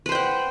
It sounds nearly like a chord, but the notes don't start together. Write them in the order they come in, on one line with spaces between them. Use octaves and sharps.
B4 C5 G5 F#5